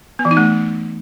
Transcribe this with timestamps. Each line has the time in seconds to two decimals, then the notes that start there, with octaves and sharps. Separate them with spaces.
0.19 B3
0.25 E3
0.31 D#4
0.37 A3